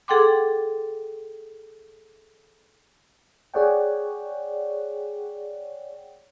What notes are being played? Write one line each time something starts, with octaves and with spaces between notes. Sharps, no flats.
G#4 A4 F#5 G5 C6 D6
G#4 C#5 D5 F#5 G5